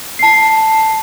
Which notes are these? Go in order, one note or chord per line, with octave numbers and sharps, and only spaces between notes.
A5 C7